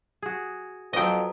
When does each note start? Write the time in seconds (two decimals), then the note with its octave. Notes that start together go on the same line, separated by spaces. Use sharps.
0.22 F#4 G#4
0.93 F2 F#3 B3 D#5 G5